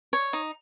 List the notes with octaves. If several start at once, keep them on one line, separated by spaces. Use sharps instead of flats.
C#5
D#4